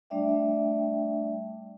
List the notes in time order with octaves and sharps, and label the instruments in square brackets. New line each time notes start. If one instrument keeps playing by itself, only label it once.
[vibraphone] G3 A3 D4 D5 E5 G5